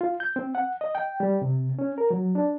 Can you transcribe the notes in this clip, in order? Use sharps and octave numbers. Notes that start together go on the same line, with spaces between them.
F4
G6
C4
F#5
D#5
G5
G3
C3
C#4
A#4
F#3
D4